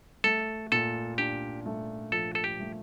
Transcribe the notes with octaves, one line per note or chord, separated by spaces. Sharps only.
A3 A4
A#2 A4
D4 G4
A3
F3 A4
A4
G4
A3